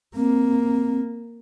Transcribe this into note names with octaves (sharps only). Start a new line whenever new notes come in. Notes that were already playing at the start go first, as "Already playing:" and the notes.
A#3 C4